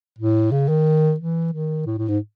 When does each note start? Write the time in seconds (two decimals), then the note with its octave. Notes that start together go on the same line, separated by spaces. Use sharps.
0.18 A2
0.51 C#3
0.68 D#3
1.19 E3
1.52 D#3
1.86 A2
1.98 A2
2.08 G#2